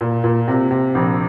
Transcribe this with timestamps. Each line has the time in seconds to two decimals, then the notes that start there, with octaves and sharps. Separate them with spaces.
0.01 A#2
0.24 A#2
0.48 C3
0.71 C3
0.95 A#1